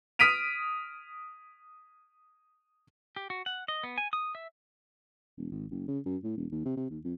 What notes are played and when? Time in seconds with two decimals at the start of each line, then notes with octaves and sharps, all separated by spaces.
0.19 D#6 F6 B6 D7 D#7 F7
3.16 G4
3.30 F#4
3.46 F#5
3.68 D#5
3.83 B3
3.98 G#5
4.13 D#6
4.35 E5
5.37 E1
5.51 G#1
5.71 F#1
5.88 C#3
6.06 F#2
6.24 A2
6.37 E1
6.52 D#2
6.65 C3
6.77 C3
6.91 D#2
7.05 F2